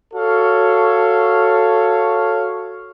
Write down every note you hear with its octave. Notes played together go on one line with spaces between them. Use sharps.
F#4 A4 C#5 F5